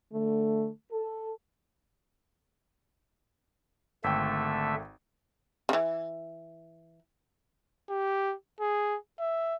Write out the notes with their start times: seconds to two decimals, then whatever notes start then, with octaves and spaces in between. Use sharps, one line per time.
0.13 D3 A3
0.91 A4
4.04 G#1 D3 A3 E5 G5
5.69 C#3 E3
7.90 G4
8.60 G#4
9.20 E5